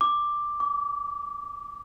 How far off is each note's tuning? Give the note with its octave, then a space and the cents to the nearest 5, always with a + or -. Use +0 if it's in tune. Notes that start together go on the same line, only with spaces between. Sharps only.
D6 +5
D6 -35